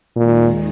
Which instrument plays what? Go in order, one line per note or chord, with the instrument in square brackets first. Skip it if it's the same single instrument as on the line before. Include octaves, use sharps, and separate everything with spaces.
[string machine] D#2 D#3 G#3 [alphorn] A#2